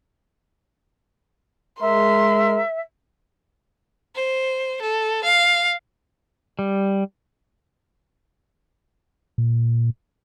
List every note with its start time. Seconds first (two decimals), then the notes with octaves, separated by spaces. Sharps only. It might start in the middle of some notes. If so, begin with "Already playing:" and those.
1.81 G#3 A#4 E5 C6
4.16 C5
4.82 A4
5.24 F5
6.59 G3
9.38 A#2